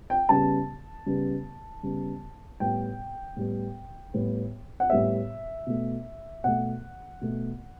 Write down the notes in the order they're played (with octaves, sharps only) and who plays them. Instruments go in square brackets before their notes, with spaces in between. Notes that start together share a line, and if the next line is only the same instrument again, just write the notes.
[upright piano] G5
C#3 G3 B3 A5
C#3 G3 B3
C#3 G3 B3
A2 G3 B3 G5
A2 G3 B3
A2 G3 B3
F#5
A2 G3 B3 E5
B2 A3
B2 A3 F#5
B2 A3